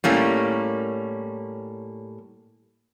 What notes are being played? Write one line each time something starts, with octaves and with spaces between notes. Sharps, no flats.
A2 G3 A#3 C#4